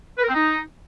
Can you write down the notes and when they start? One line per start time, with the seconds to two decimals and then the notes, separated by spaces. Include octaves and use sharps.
0.18 B4
0.23 A#4
0.29 C4
0.34 D#4